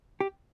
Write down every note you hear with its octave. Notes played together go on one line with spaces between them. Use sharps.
G4